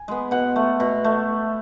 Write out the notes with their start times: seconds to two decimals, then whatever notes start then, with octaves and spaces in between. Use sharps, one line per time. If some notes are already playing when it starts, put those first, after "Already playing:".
Already playing: G#5
0.08 G#3 B3
0.31 B2 F#5
0.56 A3
0.80 B2
1.04 A3